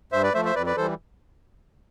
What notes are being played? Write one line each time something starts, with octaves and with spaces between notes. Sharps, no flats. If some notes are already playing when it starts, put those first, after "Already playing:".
G2 C5 E5
B4 D5
F3 A3 C5 E5
C5 E5
F2 B4 D5
B4 D5
E3 G3 A4 C5